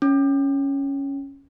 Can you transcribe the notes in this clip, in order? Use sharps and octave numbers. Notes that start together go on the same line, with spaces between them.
C#4